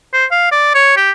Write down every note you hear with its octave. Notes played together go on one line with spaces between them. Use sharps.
C5
F5
D5
C#5
G4